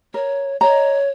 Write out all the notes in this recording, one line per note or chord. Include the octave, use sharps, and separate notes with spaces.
A#4 C#5
C#5 D#5 A#5